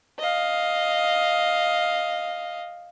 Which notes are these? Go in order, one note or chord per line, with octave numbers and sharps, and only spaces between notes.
D#5 F5